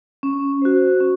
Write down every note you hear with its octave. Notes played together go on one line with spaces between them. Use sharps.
C#4
F#4 C5
C#4